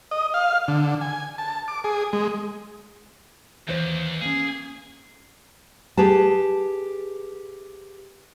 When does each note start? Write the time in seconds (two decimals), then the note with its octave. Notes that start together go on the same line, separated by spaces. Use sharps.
0.11 D#5
0.34 F5
0.68 D3
1.01 G#5
1.38 A5
1.68 D6
1.84 G#4
2.13 G#3
3.68 D#2 E3 C5 C#5
4.21 A#3 C#4 G#4
5.97 G4 G#4 B4 A5